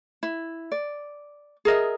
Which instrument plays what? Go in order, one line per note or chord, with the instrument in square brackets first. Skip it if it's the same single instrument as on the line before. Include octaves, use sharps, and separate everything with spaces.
[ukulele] E4
D5
G#4 A#4 D#5 E5